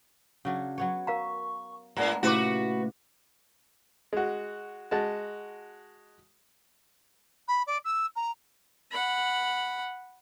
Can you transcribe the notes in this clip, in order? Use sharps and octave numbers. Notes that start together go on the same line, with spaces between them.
C#3 F#3 D4
F#3 B3 C#5
A#4 F5 A#5 C#6
A2 G#3 B3 D4 A#5
A#2 C#3 A3 E4 F#4 G4 B4 D6
G#3 F#4
G#3 F#4 A5
B5
D5
E6
A#5
F#5 B5